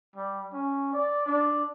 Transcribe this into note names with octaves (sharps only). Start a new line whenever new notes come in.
G3
C#4
D5
D4